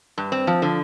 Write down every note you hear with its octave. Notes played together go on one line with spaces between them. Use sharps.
G2
C4
F3
D3